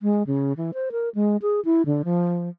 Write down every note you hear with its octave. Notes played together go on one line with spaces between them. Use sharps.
G#3
C#3
E3
C5
A#4
G#3
G#4
E4
D3
F3